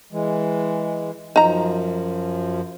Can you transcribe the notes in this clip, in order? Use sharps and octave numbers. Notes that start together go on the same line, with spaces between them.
E3 G#3
F#2 F3 D#4 A#5